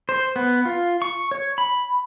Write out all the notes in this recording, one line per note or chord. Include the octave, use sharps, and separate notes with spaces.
C5
B3
F4
C#6
C#5
B5